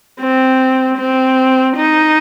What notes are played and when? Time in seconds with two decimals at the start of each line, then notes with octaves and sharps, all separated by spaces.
0.20 C4
0.98 C4
1.77 D#4